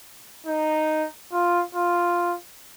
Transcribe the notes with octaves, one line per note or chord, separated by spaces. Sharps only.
D#4
F4
F4